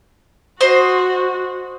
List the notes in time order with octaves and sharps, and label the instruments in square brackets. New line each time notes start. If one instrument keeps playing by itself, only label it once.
[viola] F#4 [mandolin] C5 D#5